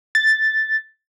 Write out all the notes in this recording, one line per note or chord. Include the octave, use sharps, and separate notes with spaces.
A6